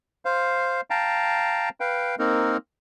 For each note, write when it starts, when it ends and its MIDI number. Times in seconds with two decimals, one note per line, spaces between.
0.25 0.81 72
0.25 0.81 77
0.90 1.69 77
0.90 1.69 79
0.90 1.69 81
0.90 1.69 82
1.80 2.15 71
1.80 2.15 77
1.80 2.15 79
2.19 2.57 58
2.19 2.57 60
2.19 2.57 63
2.19 2.57 70